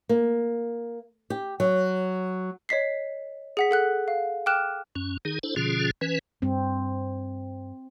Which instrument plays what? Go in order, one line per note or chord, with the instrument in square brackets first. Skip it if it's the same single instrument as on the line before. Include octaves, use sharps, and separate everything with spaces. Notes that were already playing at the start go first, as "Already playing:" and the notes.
[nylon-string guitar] A#3
G4
F#3
[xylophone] C#5 D#5 B6 C7
G#4 F#5 B6
A4 F#5 F#6
F5
G5 D6 F6 F#6 E7
[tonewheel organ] F#2 C#4
D#3 D#4 G#4
D4 E4 A4 C5
B2 D3 F3 C#4 F4 G#4
E3 C#4 B4
[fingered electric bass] G2 [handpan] C4